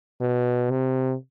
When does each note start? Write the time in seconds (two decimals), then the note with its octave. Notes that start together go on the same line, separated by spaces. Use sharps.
0.21 B2
0.70 C3